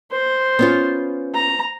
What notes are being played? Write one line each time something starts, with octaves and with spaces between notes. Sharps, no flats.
C5
B3 C#4 F4
A#5